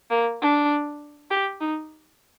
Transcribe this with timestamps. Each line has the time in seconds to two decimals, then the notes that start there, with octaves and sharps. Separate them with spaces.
0.10 A#3
0.41 D4
1.31 G4
1.61 D#4